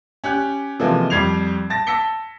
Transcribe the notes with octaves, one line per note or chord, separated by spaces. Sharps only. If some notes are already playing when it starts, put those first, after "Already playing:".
C#4 G4 F#6 G6
C3 E3 F3 G#3 A#3 A4
F2 G3 G#6 C7 F7
A5 A6 A#6
A5 E6 A#6 B6 C#7 G7